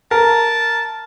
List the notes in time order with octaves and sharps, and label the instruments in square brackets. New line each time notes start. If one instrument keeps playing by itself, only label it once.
[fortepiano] A#4 [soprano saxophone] A5